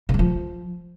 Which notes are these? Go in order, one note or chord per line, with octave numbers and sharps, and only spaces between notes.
C#3
F#3
F3